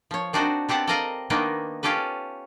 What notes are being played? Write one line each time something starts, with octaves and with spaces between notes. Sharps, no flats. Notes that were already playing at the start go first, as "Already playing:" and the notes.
F3 C#5
C4 D4 D#4 F#4 C5
B3 C4 G4 F#5 A5
A4 A#4 D5 D#5 F5 A#5
D#3 A#3 B3 D4 D#4
C#4 F4 G4 A4 B4